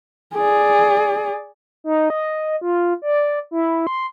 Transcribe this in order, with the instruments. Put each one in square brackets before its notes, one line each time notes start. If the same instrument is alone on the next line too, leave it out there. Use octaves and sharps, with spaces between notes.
[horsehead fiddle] G#4 D5
[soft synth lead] D#4
D#5
F4
D5
E4
C6